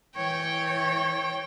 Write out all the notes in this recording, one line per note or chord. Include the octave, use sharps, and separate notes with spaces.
E3 C#5 G5